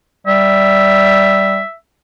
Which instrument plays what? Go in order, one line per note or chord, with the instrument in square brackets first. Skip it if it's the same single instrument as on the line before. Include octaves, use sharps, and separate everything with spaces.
[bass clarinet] G3 [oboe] E5